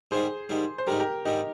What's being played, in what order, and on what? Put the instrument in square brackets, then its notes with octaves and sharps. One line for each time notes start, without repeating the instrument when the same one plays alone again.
[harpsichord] G#2 D#3 G3 [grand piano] G#4 C5
[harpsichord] G#2 D#3 G3
[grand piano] C5
[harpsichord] G#2 D#3 G3 [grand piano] G4 A#4
[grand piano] G4 A#4
[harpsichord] G#2 D#3 G3 [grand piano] D#4 G4